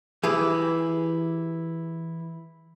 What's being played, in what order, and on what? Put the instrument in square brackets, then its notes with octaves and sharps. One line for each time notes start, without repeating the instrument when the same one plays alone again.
[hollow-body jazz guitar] E3 E4 G4 G#4 B4